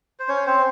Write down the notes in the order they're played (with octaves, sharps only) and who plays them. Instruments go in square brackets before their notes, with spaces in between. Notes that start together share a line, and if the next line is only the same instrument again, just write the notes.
[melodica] C5
C#4 C#5
C4 C5